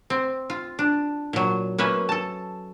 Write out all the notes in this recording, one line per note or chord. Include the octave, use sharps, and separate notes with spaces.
C4
F4
D4
A#2 F#3
A#3 C#4 B4 E5
A4 A5